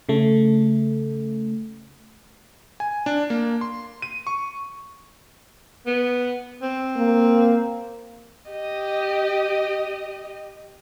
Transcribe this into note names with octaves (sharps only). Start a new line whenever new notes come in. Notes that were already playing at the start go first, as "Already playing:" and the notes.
C#3 A3
G#5
D4
A#3
C6
D#7
C#6
B3
C4
A#3
G4 D#5